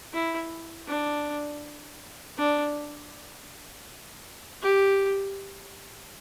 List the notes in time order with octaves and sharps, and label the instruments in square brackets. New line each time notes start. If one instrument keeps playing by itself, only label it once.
[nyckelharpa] E4
D4
D4
G4